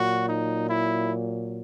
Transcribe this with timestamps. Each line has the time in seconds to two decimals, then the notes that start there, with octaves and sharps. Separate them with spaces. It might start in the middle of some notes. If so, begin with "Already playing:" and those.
Already playing: A#2 F#3 F#4
0.27 D#4
0.68 E4